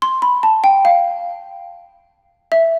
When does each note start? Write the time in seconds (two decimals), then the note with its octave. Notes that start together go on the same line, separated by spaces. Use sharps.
0.02 C6
0.22 B5
0.43 A5
0.64 G5
0.85 F5
2.52 E5